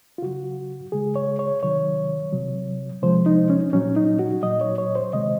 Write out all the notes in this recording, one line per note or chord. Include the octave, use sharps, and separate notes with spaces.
F4
C#3 F#3 F#4
C#3 G#3 G#4
C#5
C#5
C3 D#3 F#3 C#5
C3 F#3
C3 F3 G#3 C5
D#4
C#4
A#2 F#3 C#4
D#4
F#4
A#2 F#3 D#5
C#5
C#5
C5
C3 D#3 G#3 D#5